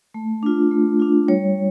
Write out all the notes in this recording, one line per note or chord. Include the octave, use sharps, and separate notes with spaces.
A3
D4 F4
A3
D4 F4
G3 C#5